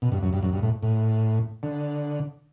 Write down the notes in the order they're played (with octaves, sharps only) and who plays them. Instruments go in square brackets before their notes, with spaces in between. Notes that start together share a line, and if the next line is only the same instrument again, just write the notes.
[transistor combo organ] B2
G2
F#2
G2
F#2
G2
A2
A2
D3